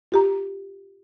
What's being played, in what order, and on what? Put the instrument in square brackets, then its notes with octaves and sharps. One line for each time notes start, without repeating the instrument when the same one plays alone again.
[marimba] F4 G4 A#5